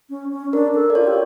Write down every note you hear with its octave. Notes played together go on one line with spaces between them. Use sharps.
C#4
C#4
D4 A#4
A4
D5
F4 C#5
G4